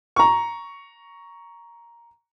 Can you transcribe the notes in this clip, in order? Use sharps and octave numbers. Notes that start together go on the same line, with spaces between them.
A#5 C#6